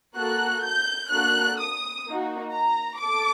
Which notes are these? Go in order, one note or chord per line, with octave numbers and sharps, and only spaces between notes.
A#3 F#4 A4 F#6
G6
A#3 D4 F#4 A4 F#6
D#6
A#3 D#4 F#4
A#5
A4 D6